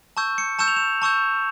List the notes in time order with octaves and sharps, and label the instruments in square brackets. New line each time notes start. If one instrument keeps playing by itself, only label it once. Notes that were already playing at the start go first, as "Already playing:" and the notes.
[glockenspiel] A5 C#6 E6 G6
C#7
A5 C#6 E6 G6 E7
F7
E7
A5 C#6 E6 G6